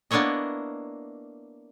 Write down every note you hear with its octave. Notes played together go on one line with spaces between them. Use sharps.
A#3 B3 D4 E4 C#5 D#5